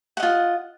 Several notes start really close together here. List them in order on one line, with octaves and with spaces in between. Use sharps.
F#5 D#5 F4